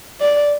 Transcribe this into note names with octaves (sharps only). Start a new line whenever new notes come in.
D5